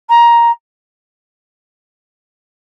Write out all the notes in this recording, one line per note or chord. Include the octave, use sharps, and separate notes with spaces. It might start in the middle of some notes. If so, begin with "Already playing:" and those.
A#5